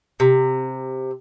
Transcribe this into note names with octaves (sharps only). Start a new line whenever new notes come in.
C3